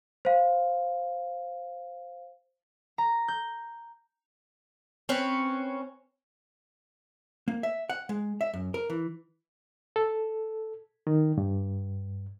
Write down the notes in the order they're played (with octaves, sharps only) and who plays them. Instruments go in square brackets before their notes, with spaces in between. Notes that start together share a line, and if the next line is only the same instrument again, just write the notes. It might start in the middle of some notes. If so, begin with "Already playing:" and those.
[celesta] C5 F5
[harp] A#5
G6
[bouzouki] C4 C#4 B4
[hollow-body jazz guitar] A#3
E5
F#5
G#3
E5
F#2
A#4
E3
[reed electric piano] A4
D#3
G2